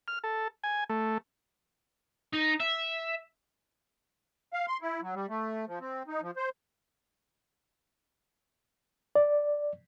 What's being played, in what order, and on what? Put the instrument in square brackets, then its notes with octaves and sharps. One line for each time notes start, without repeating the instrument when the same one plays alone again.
[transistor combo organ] F6
A4
G#5
A3
[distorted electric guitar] D#4
E5
[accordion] F5
C6
E4
F#3
G3
A3
F3
C4
D#4
F3
C5
[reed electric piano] D5